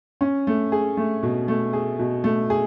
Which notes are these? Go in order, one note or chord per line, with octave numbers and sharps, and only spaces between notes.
C#4
A3
G#4
A3
B2
A3
G#4
B2
A3
G#4